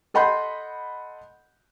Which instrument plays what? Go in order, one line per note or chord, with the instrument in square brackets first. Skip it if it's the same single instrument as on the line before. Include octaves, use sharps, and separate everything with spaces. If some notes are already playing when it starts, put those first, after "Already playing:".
[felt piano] A4 D#5 F#5 B5 C6 G6